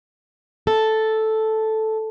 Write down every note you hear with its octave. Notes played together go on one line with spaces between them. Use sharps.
A4